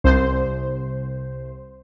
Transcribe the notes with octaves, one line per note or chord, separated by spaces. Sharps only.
C2 C5